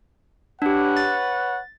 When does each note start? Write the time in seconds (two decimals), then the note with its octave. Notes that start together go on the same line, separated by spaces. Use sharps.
0.62 D4 G4 B4 C#5 F#5
0.97 A6